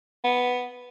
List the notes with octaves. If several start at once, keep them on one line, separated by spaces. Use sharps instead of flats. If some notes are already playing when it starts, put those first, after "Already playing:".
B3